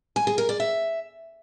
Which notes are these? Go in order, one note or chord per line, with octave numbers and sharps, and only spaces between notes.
G#5
G#4
A#4
D5
E5